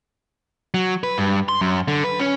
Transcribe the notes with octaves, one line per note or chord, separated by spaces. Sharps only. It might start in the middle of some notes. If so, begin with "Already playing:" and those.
F#3
B4
G2
C6
F#2
D3
B4
C#4